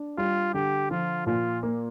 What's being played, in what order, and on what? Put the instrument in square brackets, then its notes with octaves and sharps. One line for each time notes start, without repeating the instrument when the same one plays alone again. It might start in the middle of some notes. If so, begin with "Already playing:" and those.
Already playing: [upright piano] D4
[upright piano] G3 [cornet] F4
[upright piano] D3 [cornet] G4
[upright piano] F3 [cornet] F4
[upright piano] A#2 [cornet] F4
[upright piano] A#3